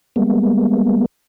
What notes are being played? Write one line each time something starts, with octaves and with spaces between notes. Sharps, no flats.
G3 G#3 A#3 B3